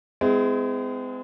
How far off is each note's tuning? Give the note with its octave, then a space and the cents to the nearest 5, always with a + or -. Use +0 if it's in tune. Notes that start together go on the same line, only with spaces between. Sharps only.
G#3 +0 C4 -45 E4 +0